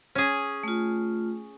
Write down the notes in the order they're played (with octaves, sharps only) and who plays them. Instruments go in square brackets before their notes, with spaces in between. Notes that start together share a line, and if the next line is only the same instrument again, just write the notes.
[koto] C#4 G#4
[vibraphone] A3 F4